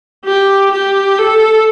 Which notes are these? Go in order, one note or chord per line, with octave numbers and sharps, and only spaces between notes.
G4
G4
A4